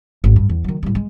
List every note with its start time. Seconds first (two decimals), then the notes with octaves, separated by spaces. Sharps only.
0.24 G#1
0.36 G2
0.49 E2
0.64 D#3 F#3
0.83 A2 G3
0.95 G#3